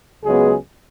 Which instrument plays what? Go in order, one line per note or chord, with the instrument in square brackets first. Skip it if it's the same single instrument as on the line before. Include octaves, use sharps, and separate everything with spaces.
[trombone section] C#2 C#3 F#3 G#3 B3 G#4